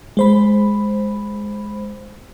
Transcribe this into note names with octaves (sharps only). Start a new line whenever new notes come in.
G#3 C5 B5